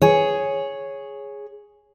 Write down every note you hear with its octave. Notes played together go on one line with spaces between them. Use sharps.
G#4 C#5